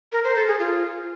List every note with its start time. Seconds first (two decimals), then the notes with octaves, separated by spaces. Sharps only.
0.12 A#4
0.24 C5
0.36 A4
0.48 G#4
0.59 F4